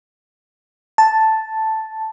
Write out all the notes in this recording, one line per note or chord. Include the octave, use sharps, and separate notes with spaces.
A5